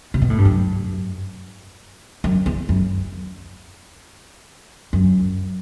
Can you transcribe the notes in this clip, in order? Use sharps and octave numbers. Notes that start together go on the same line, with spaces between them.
C3
B2
A2
G2
F#2
F#2
E2
F#2
F#2